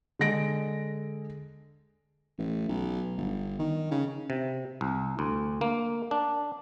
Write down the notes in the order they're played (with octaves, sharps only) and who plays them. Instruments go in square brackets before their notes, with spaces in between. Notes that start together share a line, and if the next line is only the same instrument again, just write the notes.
[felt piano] D3 G#3 A#6 D7
[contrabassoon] A1
B1
G1
D#3
C#3
[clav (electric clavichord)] C3
C2
D2
A#3
D4